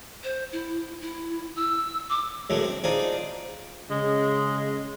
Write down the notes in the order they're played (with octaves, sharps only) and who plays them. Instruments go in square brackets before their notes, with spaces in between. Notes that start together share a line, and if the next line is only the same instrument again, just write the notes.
[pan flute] C5
E4
E4
E6
D6
[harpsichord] F#2 A2 D3 G#3 A3
C4
C4 D4 D#4 F4 G#4
[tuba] C#3 [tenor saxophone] G#3